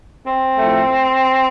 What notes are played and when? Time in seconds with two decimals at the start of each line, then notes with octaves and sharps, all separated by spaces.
0.25 C4
0.58 A2 F3 A3